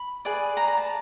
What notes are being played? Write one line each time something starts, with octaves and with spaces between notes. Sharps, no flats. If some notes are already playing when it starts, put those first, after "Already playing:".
Already playing: B5
G#4 B4 D5
A#5
A#5
A5